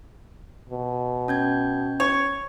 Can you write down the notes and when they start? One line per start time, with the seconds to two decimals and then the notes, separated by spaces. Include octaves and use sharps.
0.70 B2
1.28 C#4 G6 G#6
2.00 C#5